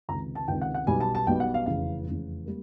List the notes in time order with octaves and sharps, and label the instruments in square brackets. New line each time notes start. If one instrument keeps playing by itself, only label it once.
[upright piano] C#2 C3 D#3 A#5
A5
C#2 C3 D#3 G5
F#5
F#5
B1 B2 G3 B3 G#5
A5
A5
B1 B2 G3 B3 G5
F#5
F5
F1 E2 C#3 F5
F1 E2 C#3
G3 A#3